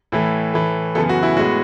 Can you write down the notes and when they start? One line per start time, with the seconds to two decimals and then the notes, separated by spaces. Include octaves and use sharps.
0.12 A2 E3 A3
0.54 A2 E3 A3
0.95 F#2 C#3 E3 B3 A4
1.09 F#4
1.23 E4
1.36 A2 G#3 B3 F#4